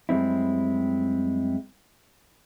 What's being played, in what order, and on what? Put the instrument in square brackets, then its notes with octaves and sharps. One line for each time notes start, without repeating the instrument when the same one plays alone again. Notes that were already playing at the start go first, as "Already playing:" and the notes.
[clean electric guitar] F#2 G3 G#3 C4 E4